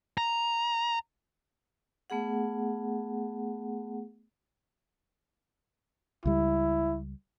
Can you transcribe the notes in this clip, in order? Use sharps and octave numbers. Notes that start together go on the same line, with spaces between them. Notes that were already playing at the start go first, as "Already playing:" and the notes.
A#5
A3 B3 G#4 F#5
C#2 G3 E4